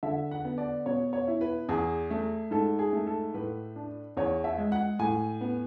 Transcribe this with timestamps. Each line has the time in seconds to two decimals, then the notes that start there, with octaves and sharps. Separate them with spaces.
0.03 D3 E5
0.31 F#5
0.45 B3
0.58 D5
0.86 B2 C#5
1.13 C#5
1.28 E4
1.41 B4
1.69 E2 G#4
2.11 A3
2.51 G#2 A4
2.79 G#4
2.93 A3
3.07 A4
3.34 A2 B4
3.76 D4
4.17 E2 C#5
4.44 E5
4.58 G#3
4.72 F#5
4.99 A2 G#5
5.41 B3